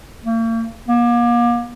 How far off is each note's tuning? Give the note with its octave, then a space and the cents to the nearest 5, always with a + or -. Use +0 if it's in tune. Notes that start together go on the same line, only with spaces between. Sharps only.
A#3 -45
A#3 +35